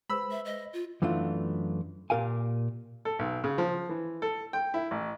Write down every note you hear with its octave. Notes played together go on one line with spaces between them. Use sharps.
G#3 B4 C5 B5 E6
E5
D#5
F4
F#2 E3 A3 D4 F4
A#2 G4 A#4 F5 G#5
A4
B1
C#3
F3
E3
A4
G5
E4
A1